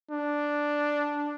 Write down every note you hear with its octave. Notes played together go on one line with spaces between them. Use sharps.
D4